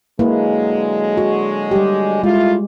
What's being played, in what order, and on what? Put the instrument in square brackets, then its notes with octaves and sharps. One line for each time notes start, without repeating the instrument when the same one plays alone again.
[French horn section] D3 F#3 G#3 [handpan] A#3 E4 B4
[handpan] F#4
G3 G4
[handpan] G#3 [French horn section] A3 E4 F4